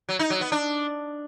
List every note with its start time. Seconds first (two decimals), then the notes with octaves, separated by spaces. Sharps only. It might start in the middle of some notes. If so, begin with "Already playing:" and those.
0.09 F#3
0.19 D#4
0.30 F#3
0.41 B3
0.52 D4